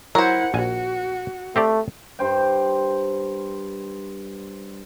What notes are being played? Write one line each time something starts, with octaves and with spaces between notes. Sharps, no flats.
F#3 E4 A#4 C5 F#5
A#1 F#4 G#5
A3 C4 G4 D5
G2 C5 G5